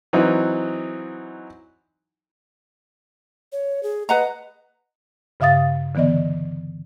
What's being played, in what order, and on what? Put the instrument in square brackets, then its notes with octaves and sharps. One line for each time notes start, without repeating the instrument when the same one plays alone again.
[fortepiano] E3 F#3 C4 D#4
[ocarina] C#5
G#4
[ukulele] B4 F#5 A#5 [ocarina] D#5
[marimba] G2 C#3 E5 F5 D#6 A6
D3 E3 B3 D5 D#5